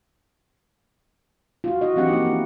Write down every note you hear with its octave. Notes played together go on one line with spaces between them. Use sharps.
F4 F#4
E4 F#4 D#5
E3 F3 C4 D4 G4 F#5
A#3 B3 D#4
E4